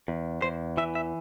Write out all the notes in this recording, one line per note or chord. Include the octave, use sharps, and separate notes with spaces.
E2
E2 C5
E3 E5
E5